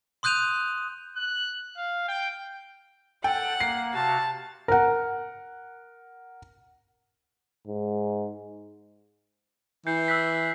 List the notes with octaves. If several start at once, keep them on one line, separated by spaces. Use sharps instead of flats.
C6 D#6 F#6 G6 D#7 F7
F#6
F5
G5
A4 F#5 G5 A6
A#3 C7
C3 F#4 F5 A5
A#4 F#5
G#2
E3 G6 C7 C#7
E6 F#6 B6